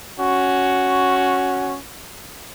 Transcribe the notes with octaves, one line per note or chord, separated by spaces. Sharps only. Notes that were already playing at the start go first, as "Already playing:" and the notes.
C#4 F#4